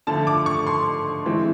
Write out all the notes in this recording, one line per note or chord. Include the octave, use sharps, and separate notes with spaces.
D3 F3 A3 A5
D6
C#6
C6
E3 G#3 C4